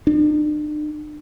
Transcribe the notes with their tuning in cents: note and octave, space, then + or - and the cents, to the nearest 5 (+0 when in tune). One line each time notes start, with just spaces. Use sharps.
D4 +45